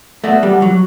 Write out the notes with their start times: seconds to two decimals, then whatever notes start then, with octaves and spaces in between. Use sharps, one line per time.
0.24 A3 B3 D4 F#4
0.43 G3
0.62 F#3